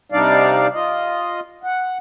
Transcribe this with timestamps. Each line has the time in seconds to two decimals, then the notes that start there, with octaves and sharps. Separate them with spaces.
0.12 C3 G3 D4 D#4 D5 F5
0.74 F4 D#5
1.64 F#5